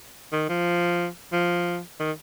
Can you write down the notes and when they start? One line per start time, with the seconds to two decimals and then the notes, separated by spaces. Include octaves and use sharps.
0.32 D#3
0.49 F3
1.32 F3
2.00 D#3